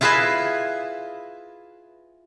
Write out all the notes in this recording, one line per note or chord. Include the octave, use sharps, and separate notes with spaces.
E4 F4 G#4 B4 D#5 E5